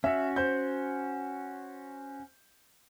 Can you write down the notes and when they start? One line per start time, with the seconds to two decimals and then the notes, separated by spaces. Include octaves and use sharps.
0.04 C#4 F#4 E5
0.36 C5 G6